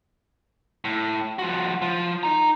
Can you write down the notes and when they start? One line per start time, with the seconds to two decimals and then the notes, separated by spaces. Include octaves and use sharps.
0.85 A2
1.39 F3 F#4
1.82 F3
2.23 D#4 A#5